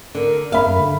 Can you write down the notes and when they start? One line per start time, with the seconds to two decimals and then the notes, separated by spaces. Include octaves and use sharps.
0.15 D3 A#4
0.52 E5 F5 B5
0.66 F#2
0.80 D3